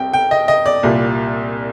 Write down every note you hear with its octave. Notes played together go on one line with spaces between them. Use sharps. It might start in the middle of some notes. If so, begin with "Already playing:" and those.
Already playing: C2 C3 G3 C4 G5
G5
D#5
D#5
D5
C2 A#2 G3 A#3